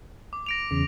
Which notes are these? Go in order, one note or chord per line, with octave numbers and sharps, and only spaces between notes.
D6
A#6 D7 F7
E2 C#3